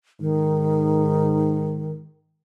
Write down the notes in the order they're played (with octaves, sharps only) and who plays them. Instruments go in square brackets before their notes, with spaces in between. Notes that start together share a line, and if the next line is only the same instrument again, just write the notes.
[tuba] G#2 [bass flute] D#3